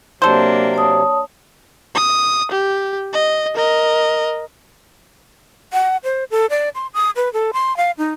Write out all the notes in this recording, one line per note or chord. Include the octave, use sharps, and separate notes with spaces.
C3 F#3 A#3 D4 A4 C5
C#5 A5 D#6
D#6
G4
D#5
A#4 D#5
F#5
C5
A4
D5
C6
D#6
B4
A4
C6
F5
D#4